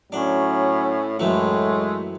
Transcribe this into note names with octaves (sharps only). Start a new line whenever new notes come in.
A2 F#3 C#4 D4
F#2 A2 E3 G#3 A3